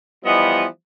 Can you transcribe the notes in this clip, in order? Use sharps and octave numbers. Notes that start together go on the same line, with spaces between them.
E3 F3 G3 B3 D#5